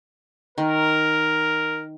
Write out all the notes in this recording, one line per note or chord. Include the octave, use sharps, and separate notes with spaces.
D#3 A#4